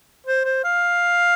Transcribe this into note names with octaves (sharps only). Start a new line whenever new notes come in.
C5
C5
F5